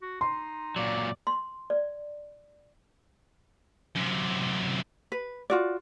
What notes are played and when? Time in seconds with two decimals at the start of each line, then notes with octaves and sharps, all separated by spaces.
0.02 F#4
0.21 D#4 C6
0.76 A#2 F#3 D5
1.27 C6
1.70 D5
3.96 F#2 C3
5.12 B4
5.50 F4 F#4 D5